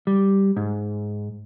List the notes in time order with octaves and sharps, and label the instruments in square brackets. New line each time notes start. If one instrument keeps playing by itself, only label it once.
[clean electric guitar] G3
G#2